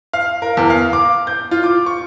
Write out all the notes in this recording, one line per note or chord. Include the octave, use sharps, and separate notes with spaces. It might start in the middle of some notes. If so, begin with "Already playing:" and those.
F5
A#4
E2
F5
D6
G6
F4
D6
C#6